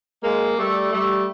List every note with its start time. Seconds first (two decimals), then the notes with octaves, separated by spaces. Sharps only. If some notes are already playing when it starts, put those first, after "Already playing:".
0.22 G#3 A#3
0.57 G3 A3
0.92 G3 A3